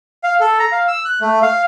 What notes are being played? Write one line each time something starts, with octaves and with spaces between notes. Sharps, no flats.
F5
A4
A#5
F5
E6
F#6
A3
F5